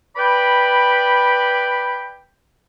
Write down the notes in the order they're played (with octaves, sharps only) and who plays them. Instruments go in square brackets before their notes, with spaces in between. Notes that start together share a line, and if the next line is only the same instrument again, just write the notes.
[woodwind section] B4 D5 G5 B5